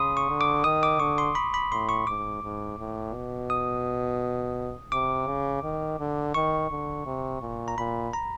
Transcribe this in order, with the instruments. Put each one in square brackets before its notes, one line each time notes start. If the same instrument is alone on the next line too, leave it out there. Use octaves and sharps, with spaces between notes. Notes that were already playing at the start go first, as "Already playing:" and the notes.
Already playing: [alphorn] C#3 [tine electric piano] B5 C6 D#6
[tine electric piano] C#6
[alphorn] D3
[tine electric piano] D6
[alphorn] D#3 [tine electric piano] D#6
[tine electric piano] D6
[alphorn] D3 [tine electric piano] C#6
[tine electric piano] C6
B5
B5
[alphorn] A2 [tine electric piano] C6
[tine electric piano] C#6
[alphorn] G#2 [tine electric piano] D6
[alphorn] G#2
A2
B2
[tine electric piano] D#6
[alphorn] C3 [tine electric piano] D6
[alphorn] C#3
D#3
D3
[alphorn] D#3 [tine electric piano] C#6
[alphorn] D3
C3
A#2
[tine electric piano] A#5
[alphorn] A#2 [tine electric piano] B5
[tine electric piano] A#5